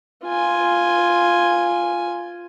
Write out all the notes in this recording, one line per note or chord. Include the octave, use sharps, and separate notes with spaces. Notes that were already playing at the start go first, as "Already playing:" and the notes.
F4 G#5